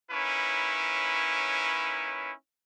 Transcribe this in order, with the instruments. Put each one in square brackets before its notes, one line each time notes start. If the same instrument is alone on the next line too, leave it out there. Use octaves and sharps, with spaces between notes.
[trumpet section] A#3 C#4 D#4 E4 B4 C#5